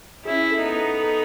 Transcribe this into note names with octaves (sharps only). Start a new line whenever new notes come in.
C#4 E4 G#4
A4
B3 D#4
A4
A4